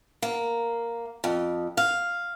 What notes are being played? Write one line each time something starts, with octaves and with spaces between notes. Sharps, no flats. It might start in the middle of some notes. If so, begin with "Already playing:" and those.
A#3
F2
F5